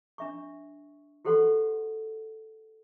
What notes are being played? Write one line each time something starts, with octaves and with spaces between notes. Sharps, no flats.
D4 E5 C#6
F#4 G4 A4 C5 F#5 C6